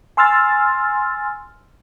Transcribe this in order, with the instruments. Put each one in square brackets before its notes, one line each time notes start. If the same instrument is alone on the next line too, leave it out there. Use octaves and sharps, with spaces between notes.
[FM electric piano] G#5 C6 E6 F6 A6